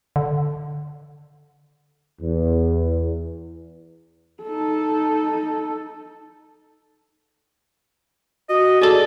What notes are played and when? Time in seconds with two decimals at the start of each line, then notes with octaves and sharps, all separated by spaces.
0.16 D3
2.21 E2
4.43 D#4 A4
8.49 F#4 D#5
8.82 G#4 A4 D5